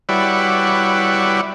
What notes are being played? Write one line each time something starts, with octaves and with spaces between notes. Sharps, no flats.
G3 E4 F#4 B4 C#5 D5